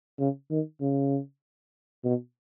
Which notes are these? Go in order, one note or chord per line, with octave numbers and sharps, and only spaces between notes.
C#3
D#3
C#3
B2